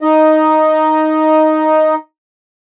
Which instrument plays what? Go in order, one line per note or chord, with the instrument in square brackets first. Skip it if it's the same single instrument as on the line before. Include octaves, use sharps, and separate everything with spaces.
[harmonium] D#4 D#5